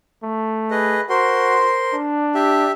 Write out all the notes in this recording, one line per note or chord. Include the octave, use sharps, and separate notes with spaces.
A3
G#4 B4 D#5
F#4 A#4 C5 C6
D4
G4 E5